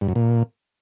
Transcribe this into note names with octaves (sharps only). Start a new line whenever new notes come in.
G2
F#2
A#2